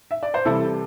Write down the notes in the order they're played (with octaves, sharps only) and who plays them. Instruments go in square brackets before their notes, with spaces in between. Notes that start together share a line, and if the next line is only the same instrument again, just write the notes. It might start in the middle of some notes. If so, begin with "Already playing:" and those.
[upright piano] E5
D5
C5
C3 E3 G3 E4 A4